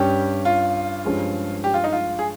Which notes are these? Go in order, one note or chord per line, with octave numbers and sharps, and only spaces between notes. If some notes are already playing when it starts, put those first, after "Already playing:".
Already playing: G2 G3 C#4 G4
F4
G2 F3 G#3 C#4 G#4
G4
F4
D#4
F4
G#4